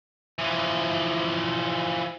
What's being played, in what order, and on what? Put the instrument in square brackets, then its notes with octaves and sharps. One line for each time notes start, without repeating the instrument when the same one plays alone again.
[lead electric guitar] E3 F3